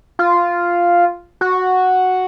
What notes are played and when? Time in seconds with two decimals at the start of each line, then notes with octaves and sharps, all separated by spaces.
0.19 F4
1.41 F#4